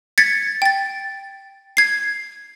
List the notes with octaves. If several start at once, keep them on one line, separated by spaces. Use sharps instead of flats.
G#6 A6 B6 C#7
G5 A6
G#6 C7